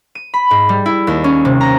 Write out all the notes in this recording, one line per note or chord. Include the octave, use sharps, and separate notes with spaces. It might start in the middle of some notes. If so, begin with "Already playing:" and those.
D#7
B5
G#2
G3
E4
D#2
C#4
C3
A#5